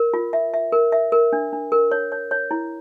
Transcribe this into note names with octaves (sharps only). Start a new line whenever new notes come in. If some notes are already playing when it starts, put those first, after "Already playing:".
Already playing: A#4
F4
E5
E5
A#4
E5
A#4
D4
D4
A#4
C#5
C#5
C#5
E4